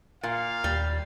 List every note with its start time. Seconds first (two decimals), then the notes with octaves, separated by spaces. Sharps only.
0.23 A#2 F5
0.64 D#2 G3